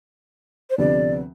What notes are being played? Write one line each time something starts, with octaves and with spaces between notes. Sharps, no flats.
C5
D2 C3 F3 B3 D5